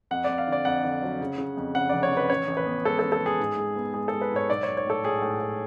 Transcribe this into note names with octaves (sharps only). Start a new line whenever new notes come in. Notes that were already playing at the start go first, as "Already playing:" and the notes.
F2 F#5
F2 D5
F5
D3 D5
F2 F#5
D3
F#3
C#3
C#3
F2
C#3 F#5
F1 D5
C#5
F2
B4
A1 C#5
A1
B4
B3
G#3 A4
A4
A1
A4
G#3
G#4
G#2
G#3
B3
G#3 G#4
A4
G#3
B4
G#2 C#5
B1 D5
B1 C#5
C#5
A2 A4
A2 G#4
A2
A2